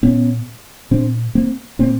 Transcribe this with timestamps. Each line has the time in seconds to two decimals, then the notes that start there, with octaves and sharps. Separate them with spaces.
0.03 A#2 B3 C#4
0.91 A#2 C4 D4
1.35 A#3 C4
1.79 A#2 A#3 C4